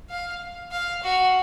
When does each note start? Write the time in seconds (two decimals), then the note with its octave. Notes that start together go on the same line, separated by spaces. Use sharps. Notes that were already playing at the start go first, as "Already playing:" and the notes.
0.10 F5
0.71 F5
1.03 F#4